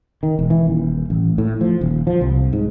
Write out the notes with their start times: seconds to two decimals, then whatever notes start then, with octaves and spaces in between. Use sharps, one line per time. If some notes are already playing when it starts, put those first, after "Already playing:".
0.23 D#3
0.39 E1
0.50 E3
0.67 D#1
1.10 A1
1.38 A2
1.61 F3
1.81 D#1
2.07 F3
2.21 C2
2.53 G#2